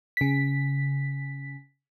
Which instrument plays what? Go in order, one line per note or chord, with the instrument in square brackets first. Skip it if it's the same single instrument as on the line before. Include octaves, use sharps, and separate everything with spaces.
[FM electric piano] C#3 B6